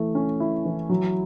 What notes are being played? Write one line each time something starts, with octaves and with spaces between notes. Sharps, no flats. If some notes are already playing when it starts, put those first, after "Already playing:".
Already playing: E3 A3
C#4
E4
E3
F#3